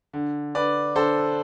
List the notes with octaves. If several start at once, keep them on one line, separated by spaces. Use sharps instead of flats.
D3
D3 B4 D5
D3 A4 C5